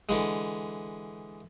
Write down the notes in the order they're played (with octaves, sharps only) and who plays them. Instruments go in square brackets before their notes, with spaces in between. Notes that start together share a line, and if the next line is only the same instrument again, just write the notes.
[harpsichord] D3 E3 G#3